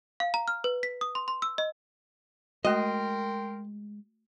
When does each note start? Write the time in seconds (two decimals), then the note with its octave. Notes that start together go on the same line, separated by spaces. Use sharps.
0.20 F5
0.34 A#5
0.48 F6
0.64 B4
0.83 B6
1.01 D#6
1.15 C6
1.28 C6
1.42 E6
1.58 D#5
2.65 G#3 A3 F#4 A#4 D#5 G5 C6